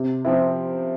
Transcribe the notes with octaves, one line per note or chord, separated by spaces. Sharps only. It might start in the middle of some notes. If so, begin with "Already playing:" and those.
Already playing: C3
F3 C4 E4